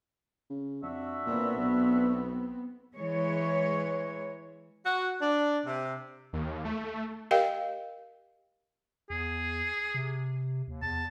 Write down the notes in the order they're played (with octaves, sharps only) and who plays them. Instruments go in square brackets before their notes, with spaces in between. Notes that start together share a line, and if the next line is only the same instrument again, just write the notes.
[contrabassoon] C#3
[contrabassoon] F2 [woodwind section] D4 F#4 E5
[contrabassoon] A#2 [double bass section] B3 C4
[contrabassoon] B1
[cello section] E3 G#3 C#5
[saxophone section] F#4
D4
C3
[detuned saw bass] D#2
A3
[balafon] G4 A#4 D#5 F5 G5
[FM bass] E2 [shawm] G#4
[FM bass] C3
D#2
[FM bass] E2 [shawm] A5